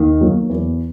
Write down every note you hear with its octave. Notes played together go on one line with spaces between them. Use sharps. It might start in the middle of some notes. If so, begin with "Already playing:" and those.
Already playing: D#2 D#3
F#3 A#3
E2